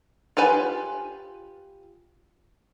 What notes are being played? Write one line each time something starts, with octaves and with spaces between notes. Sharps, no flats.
F4 G4 B4 G#5